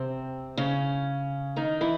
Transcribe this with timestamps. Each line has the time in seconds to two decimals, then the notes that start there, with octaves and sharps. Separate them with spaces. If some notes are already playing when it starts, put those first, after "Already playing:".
Already playing: C3 C4
0.57 C#3 C#4
1.56 D#3 D#4
1.81 E3 E4